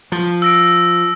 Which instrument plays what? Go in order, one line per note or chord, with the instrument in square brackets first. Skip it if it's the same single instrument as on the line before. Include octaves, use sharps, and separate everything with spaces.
[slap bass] F3
[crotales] E6 A#6 D7